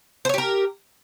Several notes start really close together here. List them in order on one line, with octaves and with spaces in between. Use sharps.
C5 C#5 G4 A#4